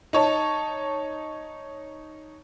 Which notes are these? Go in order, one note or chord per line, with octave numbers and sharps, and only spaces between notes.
D#4 C#5 A5